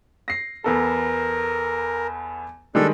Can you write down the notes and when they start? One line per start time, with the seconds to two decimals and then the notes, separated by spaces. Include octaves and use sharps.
0.28 A#6 C7
0.64 E2 B3 A4 A#4
2.75 D#3 G3 G#3 D4 A4